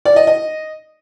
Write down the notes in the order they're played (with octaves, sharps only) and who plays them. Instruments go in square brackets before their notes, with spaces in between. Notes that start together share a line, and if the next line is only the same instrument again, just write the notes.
[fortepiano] D5
D#5
D#5